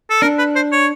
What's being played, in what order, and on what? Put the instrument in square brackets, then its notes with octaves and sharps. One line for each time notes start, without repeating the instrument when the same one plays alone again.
[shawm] A4
[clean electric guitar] D4 [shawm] A#4
[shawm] B4
C5
C#5